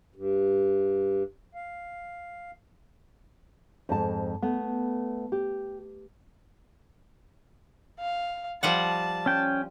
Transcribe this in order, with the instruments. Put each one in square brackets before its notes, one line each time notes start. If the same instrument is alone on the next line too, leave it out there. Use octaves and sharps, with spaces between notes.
[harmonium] G2
F5
[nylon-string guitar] F2 G#2 A5
A3 B3
G4
[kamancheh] F5
[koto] F3 G3 F#5 [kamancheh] A5
[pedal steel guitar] C#4 G5